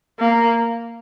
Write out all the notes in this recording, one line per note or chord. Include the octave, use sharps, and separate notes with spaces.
A#3